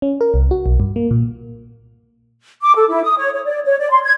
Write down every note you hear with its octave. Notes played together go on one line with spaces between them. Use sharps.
C#4
A#4
C2
F#4
B1
G2
A#3
A#2
D6
A4
E4
D#6
C#5
C#5
D5
C#5
D5
C6
G#6